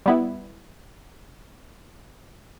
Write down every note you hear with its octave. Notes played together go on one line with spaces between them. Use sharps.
G3 B3 E4